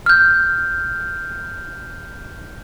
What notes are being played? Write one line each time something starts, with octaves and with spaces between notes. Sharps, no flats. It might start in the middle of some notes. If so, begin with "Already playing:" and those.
F6 G6